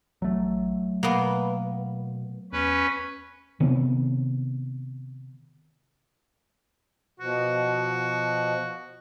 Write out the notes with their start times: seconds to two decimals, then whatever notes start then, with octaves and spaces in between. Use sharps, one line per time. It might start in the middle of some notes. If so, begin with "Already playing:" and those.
0.22 A1 F#3 A3
1.03 B2 A#3 B3
2.52 E2 C#4 B4
3.60 C3 D#3 B3
7.20 B2 F3 F#4